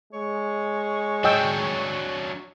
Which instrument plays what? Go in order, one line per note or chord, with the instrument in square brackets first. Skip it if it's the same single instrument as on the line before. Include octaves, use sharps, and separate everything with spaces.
[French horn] G#3 [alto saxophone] C#5
[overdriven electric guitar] F#3 D4 [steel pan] D#5 G5 E6